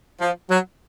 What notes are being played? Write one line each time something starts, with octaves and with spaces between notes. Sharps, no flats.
F3
F#3